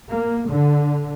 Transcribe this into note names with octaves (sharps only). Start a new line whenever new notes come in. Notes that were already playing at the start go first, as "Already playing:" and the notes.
A#3
D3